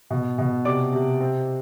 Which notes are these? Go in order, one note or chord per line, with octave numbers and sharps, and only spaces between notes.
B2
B2
C3 D5 D6
C3
C4